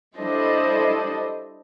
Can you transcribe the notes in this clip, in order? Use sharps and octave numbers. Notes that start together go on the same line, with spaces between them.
G3 D4 E4 A4 C5 D#5